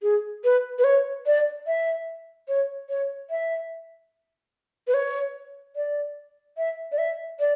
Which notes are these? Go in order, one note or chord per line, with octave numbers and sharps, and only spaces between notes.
G#4
B4
B4
C#5
D5
E5
C#5
C#5
E5
B4
C#5
D5
E5
D5
E5
D5